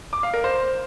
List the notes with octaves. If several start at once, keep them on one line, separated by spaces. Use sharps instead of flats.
D6
F5
A#4
C5